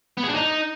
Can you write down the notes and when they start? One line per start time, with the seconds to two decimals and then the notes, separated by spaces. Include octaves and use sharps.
0.17 B3
0.23 G#4
0.29 D4
0.34 D#4